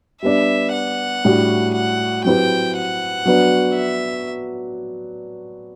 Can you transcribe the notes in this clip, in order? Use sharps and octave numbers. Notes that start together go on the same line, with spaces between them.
G3 B3 D4 E5
F#5
A2 G3 D4 F#4
F#5
F#3 C4 E4 G4 B4 G5
F#5
F#3 B3 D4 F#4 B4
E5